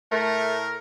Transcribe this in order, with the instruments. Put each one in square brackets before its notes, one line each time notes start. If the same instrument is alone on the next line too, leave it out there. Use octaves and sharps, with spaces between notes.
[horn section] A2 A#4 [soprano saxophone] A3